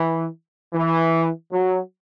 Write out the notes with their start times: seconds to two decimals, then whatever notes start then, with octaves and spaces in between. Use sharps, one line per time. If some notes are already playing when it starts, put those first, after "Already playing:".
Already playing: E3
0.73 E3
1.51 F#3